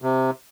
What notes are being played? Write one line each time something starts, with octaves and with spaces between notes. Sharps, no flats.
C3